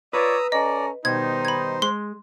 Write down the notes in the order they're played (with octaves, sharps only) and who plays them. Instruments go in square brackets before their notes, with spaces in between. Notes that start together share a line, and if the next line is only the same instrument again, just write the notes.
[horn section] F4 C#5 D5 [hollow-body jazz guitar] B4 [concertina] A#5 D#6 E6
[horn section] C#4 A4 A#5 [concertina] D5 [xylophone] D#5
[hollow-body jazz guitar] B2 [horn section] D#3 G3 D#4 [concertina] C5 [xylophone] G#6
[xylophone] B5 G#6
[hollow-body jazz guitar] G#3 [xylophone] C6